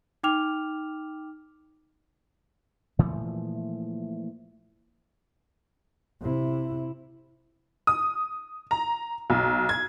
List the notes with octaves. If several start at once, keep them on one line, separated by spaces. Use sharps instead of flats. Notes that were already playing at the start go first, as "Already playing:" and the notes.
D#4 G5 D6 F6 F7
A#2 E3 F3 A3
C3 E4
D#6
A#5
B1
G#6